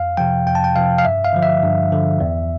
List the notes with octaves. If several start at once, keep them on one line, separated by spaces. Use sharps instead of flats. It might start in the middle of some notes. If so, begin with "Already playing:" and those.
Already playing: F2 F5
C3 F3 G5
F2 G5
A5
G5
C3 F3 F5
F5
G2 E5
F5
D3 F3
E5
G2
D3 F3
E2